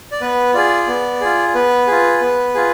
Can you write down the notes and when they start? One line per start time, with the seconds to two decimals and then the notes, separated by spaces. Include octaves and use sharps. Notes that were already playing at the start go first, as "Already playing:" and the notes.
0.12 D5
0.21 B3 B4
0.54 F4 G#4 D5
0.88 B3
1.21 F4 G#4
1.55 B3 B4
1.87 F4 G#4
2.21 B3
2.54 F4 G#4